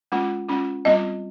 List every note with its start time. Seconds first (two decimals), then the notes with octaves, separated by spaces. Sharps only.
0.12 G#3 C#4 F4
0.48 G#3 C#4 F4
0.85 G3 C4 F4 D#5